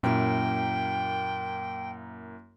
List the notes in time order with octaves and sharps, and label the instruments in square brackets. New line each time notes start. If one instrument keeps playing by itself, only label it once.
[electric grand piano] F#2 A#3 E4 [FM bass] A#2 [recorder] G5